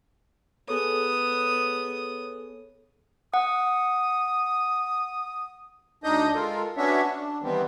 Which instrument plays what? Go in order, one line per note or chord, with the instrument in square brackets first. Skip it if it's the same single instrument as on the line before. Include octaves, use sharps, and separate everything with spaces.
[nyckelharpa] B3 D#6 [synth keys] G#4 A4 C#5
[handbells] F#5 [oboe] D#6
[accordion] D2 D4 D#4 D#5 D#6 G6
G#3 F4 A4 A#4
B3 C#4 D4 F#4 C#5 E5
D4
D#3 E3 G3 B3 C4